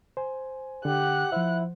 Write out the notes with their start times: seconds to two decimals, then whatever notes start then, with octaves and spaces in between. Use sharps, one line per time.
0.17 C5 G#5
0.85 D3 G4 F#5 F#6
1.32 F3 E4 C5 E5